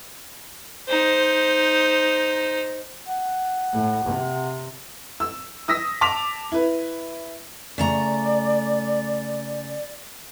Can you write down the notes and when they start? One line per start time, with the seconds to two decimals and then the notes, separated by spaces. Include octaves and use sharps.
0.88 D#4 C5
3.06 F#5
3.73 A2
4.05 C3
5.20 E6
5.68 D#6 E6 A#6 B6
6.01 A5 D6 B6 F7
6.52 E4 B4
7.78 C#3 A3 D5 A#5